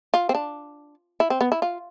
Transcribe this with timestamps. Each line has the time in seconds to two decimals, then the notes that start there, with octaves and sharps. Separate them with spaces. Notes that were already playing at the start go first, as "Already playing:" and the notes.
0.14 F4
0.29 C4
0.35 D4
1.20 E4
1.30 C4
1.41 B3
1.52 E4
1.62 F4